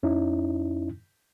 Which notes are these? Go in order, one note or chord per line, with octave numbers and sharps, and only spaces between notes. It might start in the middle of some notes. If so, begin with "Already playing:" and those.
F2 C#4 D#4 E4